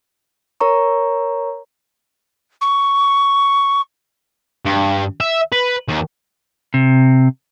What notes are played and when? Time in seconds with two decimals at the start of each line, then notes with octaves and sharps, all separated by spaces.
0.60 A#4 C#5 A#5 C#6
2.61 C#6
4.66 G2
5.21 E5
5.52 B4
5.88 D#2
6.74 C3